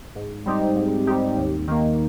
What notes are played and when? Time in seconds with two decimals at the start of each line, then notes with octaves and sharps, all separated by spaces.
0.15 G#2
0.46 G3 C4 D#4 G4
0.76 G#2
1.07 G3 C4 D#4 G4
1.37 D#2
1.67 D#3 A#3